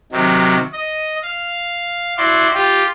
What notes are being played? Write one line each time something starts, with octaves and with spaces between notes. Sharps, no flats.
C3 D#3 F#3
D#5
F5
E4 F#4 D5 C6
F4 G4